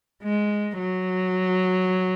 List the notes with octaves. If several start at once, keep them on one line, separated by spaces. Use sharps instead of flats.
G#3
F#3